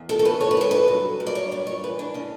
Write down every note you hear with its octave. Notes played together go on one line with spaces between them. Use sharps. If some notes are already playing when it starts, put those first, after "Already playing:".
Already playing: E2
A4
A4
C#3 B4
C#5
B4
G2 A4
B4
F#3
G2
D5
C#5
G2 D5
C#5
E3 B4
D4
C#3 C#4